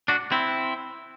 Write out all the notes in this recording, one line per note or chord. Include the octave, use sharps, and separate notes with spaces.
D4 F#4
C4 E4